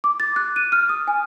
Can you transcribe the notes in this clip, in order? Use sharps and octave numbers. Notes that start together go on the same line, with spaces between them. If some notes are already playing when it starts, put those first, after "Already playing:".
D6
A6
F#6
D#7
F6
D#6
G#5